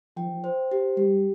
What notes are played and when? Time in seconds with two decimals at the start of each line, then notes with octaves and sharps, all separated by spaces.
0.17 F3 G5
0.44 C5
0.71 G4
0.97 G3 G4